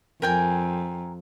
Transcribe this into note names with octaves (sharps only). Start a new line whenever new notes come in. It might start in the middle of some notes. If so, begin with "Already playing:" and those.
F2 A#4 G5 G#5